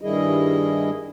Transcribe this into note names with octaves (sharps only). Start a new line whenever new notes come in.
G2 D#3 G3 E4 G#4 D#5